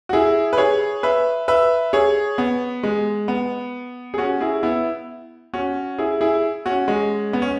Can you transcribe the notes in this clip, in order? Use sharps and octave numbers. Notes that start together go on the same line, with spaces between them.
F#4
E4 G#4
B4
G#4 C#5
B4 E5
B4 E5
G#4 C#5
B3
G#3
B3
G#4
C#4 F#4
E4 G#4
B3 E4
C#4 F#4
E4 G#4
E4 G#4
C#4 F#4
G#3 C#4
B3
C#4